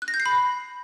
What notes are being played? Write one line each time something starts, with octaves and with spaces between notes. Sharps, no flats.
F#6
A#6
G6
C7
B5